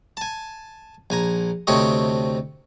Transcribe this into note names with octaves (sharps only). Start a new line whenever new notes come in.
G#5 A5
A#1 G#5 A#5
D2 C3 A3 C4 C#5 D#5